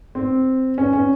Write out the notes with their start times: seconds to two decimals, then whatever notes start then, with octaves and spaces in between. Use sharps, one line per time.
0.15 C4
0.78 C#4
0.93 C#4